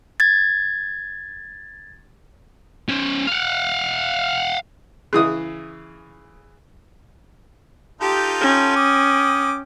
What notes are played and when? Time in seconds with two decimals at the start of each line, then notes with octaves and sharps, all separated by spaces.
0.20 G#6 A6
2.89 C#4 C5
3.27 F5 F#5
5.13 C#3 E3 D#6
8.01 D#4 F4 G4 A4
8.39 C#4 G5
8.76 D6 D#6